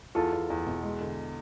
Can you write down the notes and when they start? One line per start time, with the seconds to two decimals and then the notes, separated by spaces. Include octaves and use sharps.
0.15 E2 F4 A4
0.33 E2
0.50 E2
0.66 B2
0.83 G#3
1.00 D3